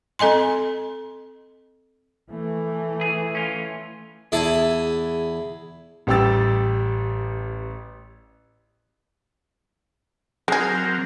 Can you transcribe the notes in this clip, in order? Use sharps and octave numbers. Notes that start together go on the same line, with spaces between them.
C4 A4 D#5 G#5 C6
E3 A3
G#4
C#4 F4
E2 E4 G#4 A5
A1 G3 G4 G5 E6 A6
F#3 G#3 C4 G#4 A#4